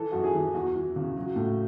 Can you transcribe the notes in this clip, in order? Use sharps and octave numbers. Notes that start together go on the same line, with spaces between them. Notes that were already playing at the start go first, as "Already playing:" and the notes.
Already playing: E3 A4
F#2 F#4
G#4
E3
E2 F#4
E3
C#3
F#3
A2